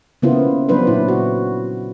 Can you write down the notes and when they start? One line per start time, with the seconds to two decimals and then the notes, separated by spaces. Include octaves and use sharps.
0.22 C#3 A#3 B3 E4 F4 C5
0.69 F#3 B3 D4 B4 C5
0.87 A#2 E4
1.08 F#4